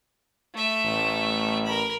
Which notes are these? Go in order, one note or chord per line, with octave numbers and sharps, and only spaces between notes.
A3 E5
A1
A#4 B5